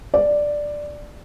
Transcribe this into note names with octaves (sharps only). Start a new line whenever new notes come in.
D5